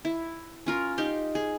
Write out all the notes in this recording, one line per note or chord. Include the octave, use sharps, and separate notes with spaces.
E4
C#4 F4 A#4
D#4 G4 C6
G#4